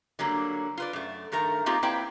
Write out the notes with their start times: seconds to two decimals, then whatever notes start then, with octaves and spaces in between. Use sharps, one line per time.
0.19 D3 F#3 G3 A#3
0.78 F4 B4 D5
0.93 F#2 A3
1.32 G2 D#3 A3 A#4 A#5
1.66 A3 A#3 C4 D#4 F4 G4
1.83 A#3 C4 E4 B4 D5 G5